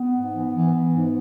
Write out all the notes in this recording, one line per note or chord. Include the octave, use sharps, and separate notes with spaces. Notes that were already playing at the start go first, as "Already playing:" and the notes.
Already playing: B3
G#2
E3
E3
E3
G#2